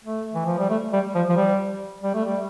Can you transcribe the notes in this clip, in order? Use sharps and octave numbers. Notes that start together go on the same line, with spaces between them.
A3
E3
F3
G3
A3
G3
F3
F3
G3
G3
A3
G3